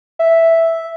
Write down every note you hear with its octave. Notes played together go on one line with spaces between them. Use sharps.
E5